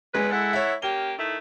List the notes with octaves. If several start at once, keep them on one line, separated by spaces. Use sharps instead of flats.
E2 F#3 G#3 B4
E4 A4 F#5
C#5 E5
A#3 C#4 G4 G7
D#3 A3 E4